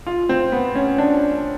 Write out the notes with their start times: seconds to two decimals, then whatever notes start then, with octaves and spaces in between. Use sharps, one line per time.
0.07 F4
0.29 C4
0.52 B3
0.75 C#4
0.98 D4